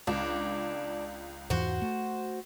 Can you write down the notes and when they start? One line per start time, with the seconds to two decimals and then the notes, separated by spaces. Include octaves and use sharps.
0.07 C#2 D4
1.50 E2 G#2 E3 F#4 C5
1.82 A3